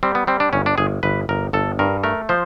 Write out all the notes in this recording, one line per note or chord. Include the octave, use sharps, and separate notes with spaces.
G3 C4
B3
G3 C4
D4
G1 C#4
D4
G1 G#4
G1 B4
G1 A#4
G1 A4
G2 A#4
A3 A#4
F3 C5